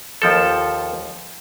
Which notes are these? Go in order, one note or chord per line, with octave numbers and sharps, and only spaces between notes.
D#2 F3 A4